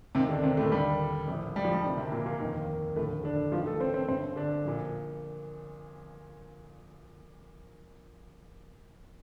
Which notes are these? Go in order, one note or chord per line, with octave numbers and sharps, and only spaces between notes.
D#2 C3 D#3 C4
D3 D4
C3 C4
A2 A3
D#2 D3 G3
A#1 A2
G3
F3
G3
D2 C3 D#3
C3 C4
A#2 A#3
A#2 A#3
F1 D#2 D#3
F1 D#2 A2 D3 A3
D3 D4
A1 G2 D#3 F3 F4
A3 A4
C4 C5
C4 C5
G1 G2 D3 C4 C5
D3 D4
A#1 A#2